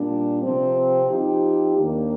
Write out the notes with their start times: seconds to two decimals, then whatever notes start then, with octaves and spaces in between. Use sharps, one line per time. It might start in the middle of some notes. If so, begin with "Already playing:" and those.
Already playing: A#2 G3 D4
0.43 C3 F3 C4
1.10 F3 C4 D#4 G4
1.77 D#2 D#3 A#3 D4 G4